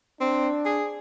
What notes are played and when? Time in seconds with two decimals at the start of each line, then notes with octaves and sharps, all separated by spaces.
0.21 C4 D4
0.65 G#4